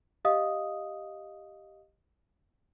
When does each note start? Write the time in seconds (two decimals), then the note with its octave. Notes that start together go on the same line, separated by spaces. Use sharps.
0.25 G4 D#5 F5 D#6